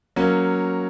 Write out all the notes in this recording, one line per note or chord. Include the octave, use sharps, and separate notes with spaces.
F#3 A#3 C#4